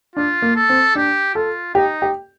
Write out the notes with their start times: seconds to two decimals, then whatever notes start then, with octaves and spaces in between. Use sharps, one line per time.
0.16 D4 F4
0.42 A#3
0.56 A4
0.70 C4
0.95 D4 G4
1.35 F4 A4
1.75 D#4 G4
2.02 G4